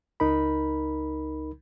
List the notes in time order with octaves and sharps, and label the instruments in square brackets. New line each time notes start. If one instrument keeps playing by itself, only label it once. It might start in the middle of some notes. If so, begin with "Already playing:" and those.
[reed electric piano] C#2 D#4 A#4 B5